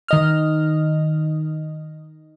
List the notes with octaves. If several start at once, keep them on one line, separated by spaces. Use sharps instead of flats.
D#3 D#5 F6